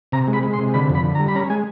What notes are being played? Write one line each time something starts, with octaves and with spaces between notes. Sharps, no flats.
C3 A#5
G#3
B5
G#3
C6
C3
D3 B5
F2
B5
D3
A#5
G3
B5
C#4 A#5
G#3 G#5